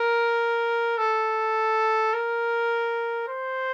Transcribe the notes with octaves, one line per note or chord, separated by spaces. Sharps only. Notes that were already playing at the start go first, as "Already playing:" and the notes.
Already playing: A#4
A4
A#4
C5